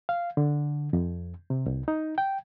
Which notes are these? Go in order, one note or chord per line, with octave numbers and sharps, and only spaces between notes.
F5
D3
F2
C3
C2
D#4
G5